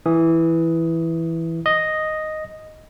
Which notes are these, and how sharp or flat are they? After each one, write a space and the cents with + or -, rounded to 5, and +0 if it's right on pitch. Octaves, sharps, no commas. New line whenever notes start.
E3 +0 D#6 +10
D#5 +0 D#6 +0